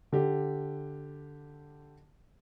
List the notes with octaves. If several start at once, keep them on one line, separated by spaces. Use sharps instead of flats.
D3 G4